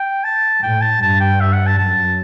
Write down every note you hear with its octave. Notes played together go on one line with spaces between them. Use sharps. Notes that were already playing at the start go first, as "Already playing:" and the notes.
Already playing: G5
A5
A2 G5
A5
G2 A5
G5
E5
F#5
A5
F#2 A5